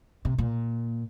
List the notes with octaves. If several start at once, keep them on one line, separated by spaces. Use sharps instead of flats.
C3
A#2